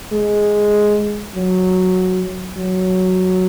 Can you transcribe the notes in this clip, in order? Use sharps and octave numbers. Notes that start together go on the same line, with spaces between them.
G#3
F#3
F#3